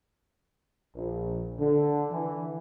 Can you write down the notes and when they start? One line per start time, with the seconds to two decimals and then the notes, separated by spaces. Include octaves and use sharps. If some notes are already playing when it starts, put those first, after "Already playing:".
0.94 A#1
1.58 D3
2.11 E3